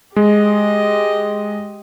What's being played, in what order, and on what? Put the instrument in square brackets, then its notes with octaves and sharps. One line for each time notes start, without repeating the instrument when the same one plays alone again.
[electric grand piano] G#3 [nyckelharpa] G4 D#5